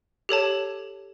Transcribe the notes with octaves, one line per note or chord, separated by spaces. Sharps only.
G4 A4 C#5 A5